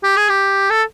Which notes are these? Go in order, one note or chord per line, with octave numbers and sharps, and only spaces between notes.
G4
G#4
G4
A4